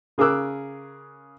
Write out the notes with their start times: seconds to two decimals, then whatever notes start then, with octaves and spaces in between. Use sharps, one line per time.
0.18 C#3 G#4 A#4 D6 E6 F#6